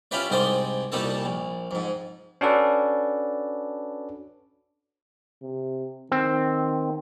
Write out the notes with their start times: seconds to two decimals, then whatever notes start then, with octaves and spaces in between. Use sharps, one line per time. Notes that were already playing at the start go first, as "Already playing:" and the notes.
0.11 C#4 E4 F4 G4 B4 D5
0.30 C2 G#2 G#3 G4 C5 D5
0.92 C2 A#2 G3 D#4 A4 A5
1.25 A#1
1.71 F2 G#2
2.41 C#4 D4 F#4 A4 B4 D5
5.42 C3
6.12 D#3 C4